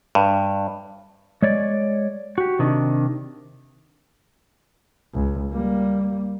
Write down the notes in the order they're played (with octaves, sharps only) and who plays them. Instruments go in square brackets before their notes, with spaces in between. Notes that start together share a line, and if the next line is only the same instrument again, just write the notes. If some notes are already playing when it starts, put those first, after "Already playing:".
[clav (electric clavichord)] G2
[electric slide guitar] G#3 C#5 D5
F#4 G4
C3 D#3 D4
[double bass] C#2
G3 A#3